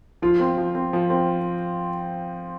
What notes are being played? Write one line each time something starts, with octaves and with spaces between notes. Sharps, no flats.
F3 F4
C4
F3
C4
F3
C4